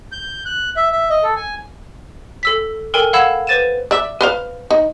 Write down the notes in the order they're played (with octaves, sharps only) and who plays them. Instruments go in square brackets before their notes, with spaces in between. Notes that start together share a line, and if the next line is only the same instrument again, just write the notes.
[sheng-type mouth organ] G6
F#6
E5
E5
D#5
A4
G#5
[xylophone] A4 E6 B6
A4 A#4 G5 G#5
F5 F#5 B5 E6 G#6 E7
B4 C5 A6 D#7 E7
[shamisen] D5 E5
B4 C5 F5
D#4